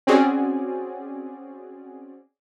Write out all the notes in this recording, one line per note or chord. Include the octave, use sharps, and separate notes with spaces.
C4 C#4 F#4 G#4 D5